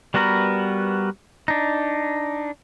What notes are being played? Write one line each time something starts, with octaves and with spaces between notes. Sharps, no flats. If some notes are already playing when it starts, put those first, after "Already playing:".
G3 B3 F#4 A#4 B4
D4 D#4